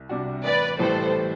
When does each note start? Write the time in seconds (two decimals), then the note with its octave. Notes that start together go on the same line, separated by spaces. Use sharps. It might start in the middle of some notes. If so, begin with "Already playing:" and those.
Already playing: C2
0.09 C3 G3 D4 F#4
0.44 A1 B4 D5
0.79 A2 E3 G3 A4 C5